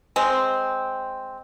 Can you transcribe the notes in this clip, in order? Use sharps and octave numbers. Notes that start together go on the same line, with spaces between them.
G#3 C4